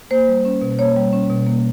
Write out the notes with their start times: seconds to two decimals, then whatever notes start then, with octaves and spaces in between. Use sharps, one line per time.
0.11 A#3 C5
0.28 G3
0.45 C#4
0.62 B2
0.79 A#3 C#5
0.96 G3
1.13 C#4
1.30 B2
1.47 A#3